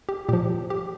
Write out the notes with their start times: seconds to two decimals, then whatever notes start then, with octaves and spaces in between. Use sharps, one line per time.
0.09 G4
0.29 A#2 F3 G4
0.70 G4